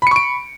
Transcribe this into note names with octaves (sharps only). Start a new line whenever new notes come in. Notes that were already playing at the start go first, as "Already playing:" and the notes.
B5 C#6 C#7 D7